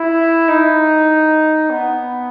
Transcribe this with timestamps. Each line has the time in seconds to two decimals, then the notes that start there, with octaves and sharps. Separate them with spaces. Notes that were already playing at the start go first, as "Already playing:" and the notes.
Already playing: E4
0.48 D#4
1.70 B3